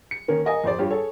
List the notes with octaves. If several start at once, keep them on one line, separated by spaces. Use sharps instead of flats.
C#7
D#3 A#3 C#4 A#4
A#4 D#5 G#5
F2 C5 D5
G2 F4 G4 C#5
G#4 A4 C#5